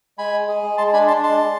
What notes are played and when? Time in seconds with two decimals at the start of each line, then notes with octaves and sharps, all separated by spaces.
0.18 G#3 G#5 B5
0.33 G#3
0.48 G#4
0.63 G#3
0.78 G#3 A5 C6
0.93 D4 G#5 B5
1.08 D4 A5 C6
1.22 G#3 A5 C6
1.38 G#3